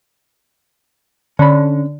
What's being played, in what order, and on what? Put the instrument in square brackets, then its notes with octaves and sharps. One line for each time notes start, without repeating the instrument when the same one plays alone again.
[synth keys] D3 [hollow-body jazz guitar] C#4 B5